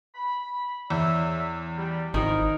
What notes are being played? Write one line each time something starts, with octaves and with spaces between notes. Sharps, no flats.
B5
E2 C#5 D5 E5
G3
G#1 F2 D#3 E4 A#4